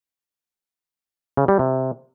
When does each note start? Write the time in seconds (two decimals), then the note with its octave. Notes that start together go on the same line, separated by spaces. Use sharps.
1.37 C#3
1.48 G3
1.59 C3